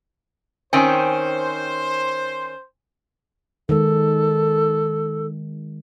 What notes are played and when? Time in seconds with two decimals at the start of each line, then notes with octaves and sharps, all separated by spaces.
0.73 D#3 C4 C#4 C5 G5 G#5
3.69 D#3 G#3 A4